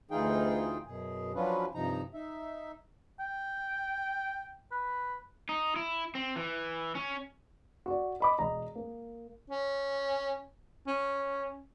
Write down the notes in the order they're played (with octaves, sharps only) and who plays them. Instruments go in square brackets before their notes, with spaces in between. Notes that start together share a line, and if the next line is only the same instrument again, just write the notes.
[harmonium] D2 E3 D#4 F4 G#4 G5
F#2 B2 G#4
F3 F#3 C#4 D4 F4 B4
G2 C3 F3 D#4 A#5
D#4 E5
[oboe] G5
B4
[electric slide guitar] D#4
E4
C4
E3
C#4
[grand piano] F#4 D5
D#5 B5 D6
E1 D#5 A#5
A#3
[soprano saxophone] C#4
[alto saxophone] C#4